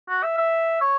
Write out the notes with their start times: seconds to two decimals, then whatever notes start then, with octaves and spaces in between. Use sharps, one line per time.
0.09 F#4
0.23 E5
0.38 E5
0.81 C#5